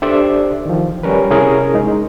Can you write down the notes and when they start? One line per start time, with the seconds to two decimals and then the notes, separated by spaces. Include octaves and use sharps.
0.02 D4 G4 A4 C5 D5 E5
0.66 D#3 F3
1.03 G3 C#4 A#4 B4
1.31 C3 C#4 E4 G#4 A#4
1.74 G#3 D#4